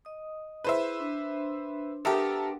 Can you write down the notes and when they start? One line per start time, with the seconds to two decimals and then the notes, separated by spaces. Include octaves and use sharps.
0.05 D#5 D#6
0.64 E4 G#4 B4 C5 E5
1.00 D4 C6
2.05 B3 G4 A4 A#4 E5